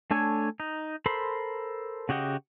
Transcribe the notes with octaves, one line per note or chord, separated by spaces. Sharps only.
A3 D4 A4 C#5 G#5
D#4
A4 A#4 C5 B5 C6
C#3 F#4 G4 D#5 F#5